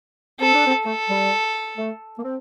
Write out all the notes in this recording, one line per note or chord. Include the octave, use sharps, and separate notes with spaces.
C4 A4
D4
C4
A3 A4
G3
A3
A#3
C4